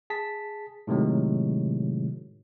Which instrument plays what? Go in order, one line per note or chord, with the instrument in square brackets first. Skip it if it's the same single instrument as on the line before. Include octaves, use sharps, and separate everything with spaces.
[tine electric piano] G#4 A5 B6
A2 C3 D#3 F#3 G#3